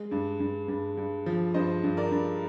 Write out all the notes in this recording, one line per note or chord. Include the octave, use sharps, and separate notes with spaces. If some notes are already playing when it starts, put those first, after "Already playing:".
Already playing: G#3
G2
G2
G2
G2
F3
G2 C5 D#5
G2
A#4 D5
G2